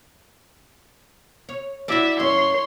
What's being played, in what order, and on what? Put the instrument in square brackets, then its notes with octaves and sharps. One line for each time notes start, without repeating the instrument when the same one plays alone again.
[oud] C#5
[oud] D4 F#4 D5 [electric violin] E4 E5
[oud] F#2 C#4 [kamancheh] C#5 [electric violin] C6